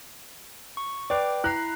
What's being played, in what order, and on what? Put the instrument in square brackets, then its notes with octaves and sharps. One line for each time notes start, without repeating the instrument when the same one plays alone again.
[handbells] C#6
[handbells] B4 G5 D6 [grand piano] D5
[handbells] E4 A#5 C7 [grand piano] F#6